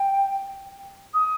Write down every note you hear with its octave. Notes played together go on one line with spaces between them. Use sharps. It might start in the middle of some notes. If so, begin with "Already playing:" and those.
Already playing: G5
D#6